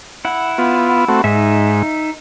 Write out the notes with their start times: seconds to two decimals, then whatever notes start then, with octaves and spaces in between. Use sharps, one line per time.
0.25 E4 F#5
0.58 B3 F4
1.08 A3 C4 F#4
1.24 G#2 D#4 E5